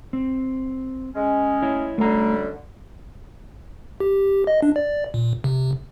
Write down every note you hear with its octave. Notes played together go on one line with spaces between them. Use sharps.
C4
G#3 C#4
E4 C#5
F#2 D3 G3 A3 A#5
G4
D#5
D4
D5
A#2
C3